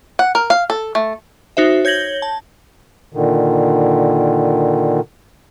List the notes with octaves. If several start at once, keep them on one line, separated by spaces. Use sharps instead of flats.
F#5
A#4
F5
A4
A3
D#4 F#4 C5 E5
C#5 G6 G#6 A#6 F#7 G7
A5
A#2 D3 D#3